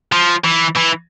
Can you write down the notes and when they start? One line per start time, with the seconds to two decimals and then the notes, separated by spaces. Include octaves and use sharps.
0.12 F3
0.44 E3
0.76 E3